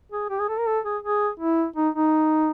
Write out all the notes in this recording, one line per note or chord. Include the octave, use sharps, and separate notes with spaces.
G#4
G4
G#4
A4
A#4
A4
G#4
G#4
E4
D#4
D#4